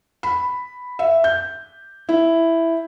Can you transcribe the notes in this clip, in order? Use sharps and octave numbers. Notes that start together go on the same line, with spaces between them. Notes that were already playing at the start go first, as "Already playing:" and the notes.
B5
E5
G6
E4